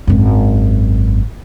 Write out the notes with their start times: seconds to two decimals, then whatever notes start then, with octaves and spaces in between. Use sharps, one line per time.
0.07 G#1 F#2